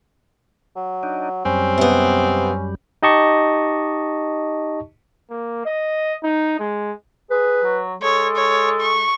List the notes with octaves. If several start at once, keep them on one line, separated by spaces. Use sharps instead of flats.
F#3
D4 D#4
F#2 G3 C4 C#4
C3 B3
D#4 G4 D#5 A5 C#6
A#3
D#5
D#4
G#3
G#4 B4
F#3
G#3 A4 C#5
C#5
C#6